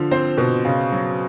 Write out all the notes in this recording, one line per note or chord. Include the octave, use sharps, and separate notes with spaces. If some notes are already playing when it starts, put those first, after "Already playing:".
Already playing: D3 F3
C4 C5
B2
C#3
F#3